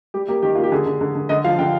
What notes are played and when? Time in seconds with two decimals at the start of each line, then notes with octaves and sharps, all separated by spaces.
0.14 G3 G4
0.28 A#3 G4
0.42 D#3 G4
0.55 A#3 F4
0.63 G4
0.72 D3 G#4
0.86 D3
1.01 D3
1.15 D3
1.29 D3 D#5
1.44 F3 F5
1.59 D3 G5